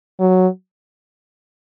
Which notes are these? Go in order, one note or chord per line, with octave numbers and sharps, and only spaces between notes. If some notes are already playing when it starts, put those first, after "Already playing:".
F#3